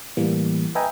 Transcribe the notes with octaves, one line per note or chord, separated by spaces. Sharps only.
A2 E3 G3 A#3
B4 D#5 E5 G5 G#5 A#5